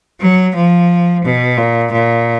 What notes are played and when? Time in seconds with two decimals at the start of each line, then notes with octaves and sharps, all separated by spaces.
0.21 F#3
0.55 F3
1.24 B2
1.57 A#2
1.92 A#2